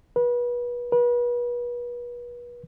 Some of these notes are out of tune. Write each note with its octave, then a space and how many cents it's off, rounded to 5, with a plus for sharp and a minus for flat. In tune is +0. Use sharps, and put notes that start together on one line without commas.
B4 -30
B4 -35